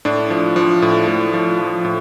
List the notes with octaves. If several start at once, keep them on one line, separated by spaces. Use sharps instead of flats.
A2 D4
F3
F3
A2
A2
F3
F3
A2